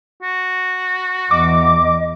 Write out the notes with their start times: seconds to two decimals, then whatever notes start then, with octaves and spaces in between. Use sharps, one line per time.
0.22 F#4
1.31 E2 D#5 D6